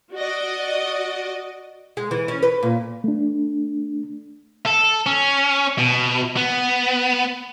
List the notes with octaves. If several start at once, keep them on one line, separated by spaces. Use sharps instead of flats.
F#4 D5 D#5
G#3
E3
C#4
B4
A#2
A3 D4
A4
C#4
B2
B3